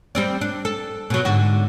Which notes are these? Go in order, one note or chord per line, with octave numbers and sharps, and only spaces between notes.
G3 C4 D5
D4
A4
B2 F#3
G#2 D3 F#4